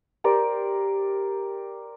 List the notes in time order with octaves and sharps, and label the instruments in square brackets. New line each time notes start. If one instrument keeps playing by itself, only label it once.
[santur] G4 A#4 C5 D5